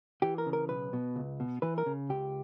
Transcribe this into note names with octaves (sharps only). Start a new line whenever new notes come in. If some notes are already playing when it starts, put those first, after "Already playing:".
E3 G4
A#4
C#3
A#4
B1 B4
B2
C#2
B2
E3 B4
A#4
C#3
C#2 G4